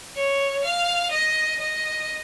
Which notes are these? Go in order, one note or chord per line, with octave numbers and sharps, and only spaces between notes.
C#5
F5
D#5
D#5